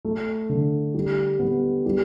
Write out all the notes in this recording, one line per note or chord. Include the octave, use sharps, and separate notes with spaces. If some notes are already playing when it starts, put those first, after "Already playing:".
A3
D3
G3
B3
G3